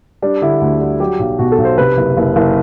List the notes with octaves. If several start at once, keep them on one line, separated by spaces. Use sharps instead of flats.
G3 D4
D3 E4
D2
G3
F#3 G4
B1
B2 F#4
A4
B1
C5
C3 B4
F#1
F#1
F#1